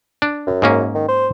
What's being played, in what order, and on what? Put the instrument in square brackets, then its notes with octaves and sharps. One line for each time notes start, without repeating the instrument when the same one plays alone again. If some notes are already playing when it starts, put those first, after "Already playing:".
[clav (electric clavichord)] D4
[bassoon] F#2
[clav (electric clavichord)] G#2 A#3 C#4
[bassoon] D#3
C5